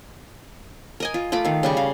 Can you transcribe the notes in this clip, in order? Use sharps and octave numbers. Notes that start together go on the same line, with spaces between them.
A#4 D#5 G#5
F4
A3 F4 B5 D6
D#3 F5
C#3 G3 C#6
F5